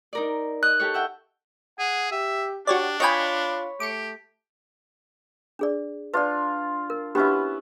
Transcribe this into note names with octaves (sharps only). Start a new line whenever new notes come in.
D#4 A#4 D5
D#5 F#6
G4 A4 C#5
E5 F#5 G5
G#4 F#5
G4 E5
D4 F#4 G4 C#5 D5
F4 C#5 D#5 G5 G#5 B5
A3 G4 D6 C#7
D4 G#4 D5
D4 F4 B4 D5
A#4
B3 C#4 D4 E4 F#4 G4